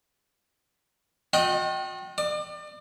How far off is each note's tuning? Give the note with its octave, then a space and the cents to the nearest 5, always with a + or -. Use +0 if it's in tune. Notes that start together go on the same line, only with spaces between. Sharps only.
F#4 -45 D#5 +0 G5 -25
D5 +35 D6 +40